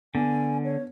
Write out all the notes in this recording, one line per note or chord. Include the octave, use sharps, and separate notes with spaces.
D3 B3 G#5
C#5